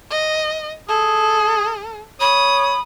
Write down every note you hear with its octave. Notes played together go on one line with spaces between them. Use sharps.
D#5
G#4 A4
C#5 B5 D#6